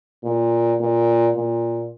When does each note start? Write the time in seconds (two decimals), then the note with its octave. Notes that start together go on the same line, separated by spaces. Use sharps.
0.24 A#2
0.80 A#2
1.35 A#2